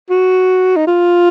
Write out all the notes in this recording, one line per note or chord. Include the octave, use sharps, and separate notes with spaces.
F#4
D#4
F4